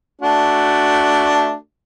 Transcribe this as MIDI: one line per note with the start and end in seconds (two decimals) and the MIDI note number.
0.22 1.55 57
0.22 1.55 62
0.22 1.55 66